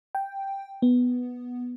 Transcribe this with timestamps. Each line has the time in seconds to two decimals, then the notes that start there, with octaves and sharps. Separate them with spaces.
0.15 G5
0.82 B3